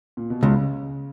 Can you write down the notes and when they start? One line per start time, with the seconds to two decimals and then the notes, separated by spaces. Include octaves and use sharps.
0.17 A#2
0.30 B2
0.43 C#2 C#3